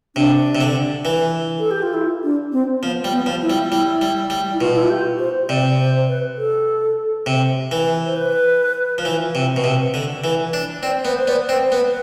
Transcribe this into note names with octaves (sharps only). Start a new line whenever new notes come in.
C3 D4
C3
D3
E3
A4
G4
F4
E4
D4
C4
F3 B3
G3
B3
F3
E4
G3
G3 E4
G3
G3
E4
B2 F4
E4
F4
G4
C5
C3 D5
C5
B4
A4
C3
E3
C5
B4
F3
E3
C3
B2
C3
D3
E3
D4
C4 D5
B3 C5
C5
B3 D5
C4 C5
B3 B4